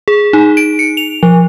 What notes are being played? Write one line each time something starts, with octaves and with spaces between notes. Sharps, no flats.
G#4
D#4
D7
C#7
F7
F3